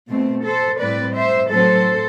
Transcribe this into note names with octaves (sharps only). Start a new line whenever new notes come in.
B2 A3 C4
A4 C5
A2 G3 C4 B4 D5
C5 E5
A2 F#3 C4 A4 C5